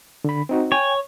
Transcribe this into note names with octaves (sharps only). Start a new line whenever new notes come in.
D3 B5
C4 D#4 F#4
C#5 G5 G#5